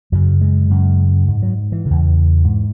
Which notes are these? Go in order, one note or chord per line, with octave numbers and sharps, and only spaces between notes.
F#2 C#3 F#3
G#3
F#2 C#3
G#2
F#3
E3
C#3
E2
G#2